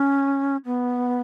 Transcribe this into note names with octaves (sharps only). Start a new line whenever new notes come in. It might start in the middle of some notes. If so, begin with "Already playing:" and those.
Already playing: C#4
B3